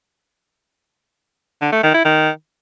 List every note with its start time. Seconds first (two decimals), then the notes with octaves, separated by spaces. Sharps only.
1.61 D3
1.72 A3
1.83 D#3
1.94 E4
2.05 D#3